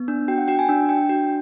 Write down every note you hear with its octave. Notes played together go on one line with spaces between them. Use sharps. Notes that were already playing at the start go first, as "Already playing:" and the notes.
Already playing: B3
D4
F#4 G5
F#5
F#4 G5
G#5
D4
D4 G5
F#4